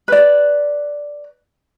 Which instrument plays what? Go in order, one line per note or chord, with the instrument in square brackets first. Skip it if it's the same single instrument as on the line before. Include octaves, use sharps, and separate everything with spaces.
[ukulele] B4 D5